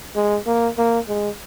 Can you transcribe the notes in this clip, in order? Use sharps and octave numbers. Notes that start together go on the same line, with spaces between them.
G#3
A#3
A#3
G#3